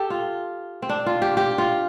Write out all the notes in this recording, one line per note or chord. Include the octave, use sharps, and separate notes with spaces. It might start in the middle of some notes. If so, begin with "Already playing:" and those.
Already playing: G4 A4
F4
C4
D4
F4
G4
G4
F4